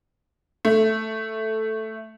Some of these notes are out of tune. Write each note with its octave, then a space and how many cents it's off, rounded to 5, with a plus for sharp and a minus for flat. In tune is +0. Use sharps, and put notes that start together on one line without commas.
A3 +0